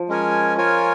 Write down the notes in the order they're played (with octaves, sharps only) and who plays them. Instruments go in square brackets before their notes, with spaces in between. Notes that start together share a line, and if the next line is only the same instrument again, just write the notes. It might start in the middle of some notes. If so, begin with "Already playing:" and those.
Already playing: [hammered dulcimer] F3
[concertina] G#3 C#4 A#4 C#5 G#5
F4 A#4 C#5 G#5